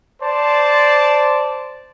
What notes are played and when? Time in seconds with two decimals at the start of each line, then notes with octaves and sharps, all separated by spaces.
0.22 C5 D5 A5